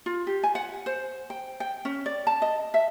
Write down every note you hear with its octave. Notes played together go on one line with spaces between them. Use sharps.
F4
G4
G#5
F#5
C5
G5
G5
C#4
D5
A5
D#5
E5